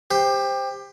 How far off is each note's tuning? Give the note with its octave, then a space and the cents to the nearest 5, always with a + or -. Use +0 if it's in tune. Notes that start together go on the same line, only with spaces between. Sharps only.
G4 +20 C5 +0